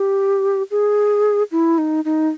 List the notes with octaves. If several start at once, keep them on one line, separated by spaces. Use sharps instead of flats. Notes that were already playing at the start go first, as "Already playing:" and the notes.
Already playing: G4
G#4
E4
D#4
D#4